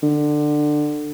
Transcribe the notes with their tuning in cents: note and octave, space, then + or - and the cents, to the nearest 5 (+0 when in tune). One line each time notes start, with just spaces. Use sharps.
D3 +20